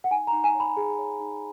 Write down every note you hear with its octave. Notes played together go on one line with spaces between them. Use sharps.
F#5
D#4 G#5
A#5
D#4
G#5
C#5
B5
G#4
C#5
D#4